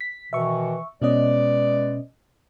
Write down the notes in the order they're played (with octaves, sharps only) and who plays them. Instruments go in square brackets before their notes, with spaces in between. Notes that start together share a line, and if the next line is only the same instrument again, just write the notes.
[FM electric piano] B6
[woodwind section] B2 D#3 E3 [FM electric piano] E5 C#6
[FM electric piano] B2 C#4 D#5 [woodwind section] G#3 B4 D5